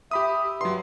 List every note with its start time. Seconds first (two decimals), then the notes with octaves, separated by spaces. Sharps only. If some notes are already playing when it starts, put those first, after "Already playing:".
0.11 G4 E5 B5 D#6
0.61 G2 F#3 C6